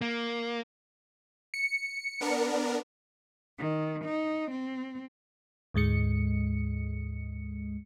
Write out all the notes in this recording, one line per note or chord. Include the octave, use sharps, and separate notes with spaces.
A#3
C#7
B3 D4 A#4
D#3
D#4
C4
D2 G#2 G#3 C#7